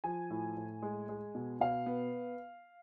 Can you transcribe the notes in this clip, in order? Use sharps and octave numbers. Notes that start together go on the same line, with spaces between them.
F3 G#5
A2
A2
G#3
G#3
B2
B2 F5
B3